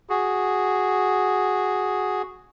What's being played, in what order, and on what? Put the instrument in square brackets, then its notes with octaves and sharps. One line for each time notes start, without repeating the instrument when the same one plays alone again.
[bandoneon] F#4 G#4